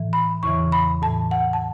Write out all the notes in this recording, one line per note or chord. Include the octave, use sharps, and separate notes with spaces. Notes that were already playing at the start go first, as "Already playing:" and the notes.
Already playing: A2 E3
B5
E2 C#3 E3 C#6
B5
A2 E3 A5
F#5
A5